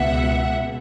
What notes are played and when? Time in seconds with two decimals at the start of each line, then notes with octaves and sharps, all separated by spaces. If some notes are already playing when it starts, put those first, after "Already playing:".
Already playing: C#2 B2 E5 F#5